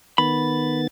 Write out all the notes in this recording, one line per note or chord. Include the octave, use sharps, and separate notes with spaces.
D#3 B3 B5 A6